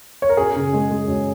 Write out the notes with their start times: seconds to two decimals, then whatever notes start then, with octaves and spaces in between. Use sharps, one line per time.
0.22 C#5
0.29 A#4
0.37 F#2 G#4
0.56 C#3
0.73 G#3
0.91 G#3
1.08 F#2